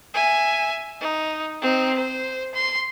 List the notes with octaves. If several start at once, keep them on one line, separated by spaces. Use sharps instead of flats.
E5 G#5
D#4
C4 D#4
C5
C6